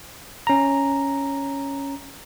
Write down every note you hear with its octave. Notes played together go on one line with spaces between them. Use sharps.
C#4 A#5